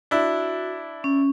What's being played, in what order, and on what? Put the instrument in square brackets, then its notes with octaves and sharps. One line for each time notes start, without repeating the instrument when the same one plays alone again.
[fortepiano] D4 E4 [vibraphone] F#4
[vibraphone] C#4